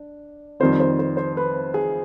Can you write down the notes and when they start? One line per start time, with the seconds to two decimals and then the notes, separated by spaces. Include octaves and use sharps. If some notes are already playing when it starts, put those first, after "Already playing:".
Already playing: D4
0.60 F2 D#3 G3 C4 C5
0.80 C5
0.99 C5
1.17 C5
1.37 B4
1.74 G#4